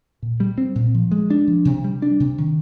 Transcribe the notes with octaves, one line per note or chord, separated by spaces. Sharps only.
A#2
G3
C4
A#2
F3
G#3
D4
F3
C3
G3
D4
C3
D#3